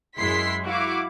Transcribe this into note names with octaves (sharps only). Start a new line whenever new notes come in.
F#2 G#3 E4 C6 B6 C7
E4 F#4 F5 D6